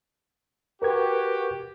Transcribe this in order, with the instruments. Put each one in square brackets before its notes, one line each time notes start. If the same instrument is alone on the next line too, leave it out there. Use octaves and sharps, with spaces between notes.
[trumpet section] F#4 G4 [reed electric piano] A#4 B4 G#6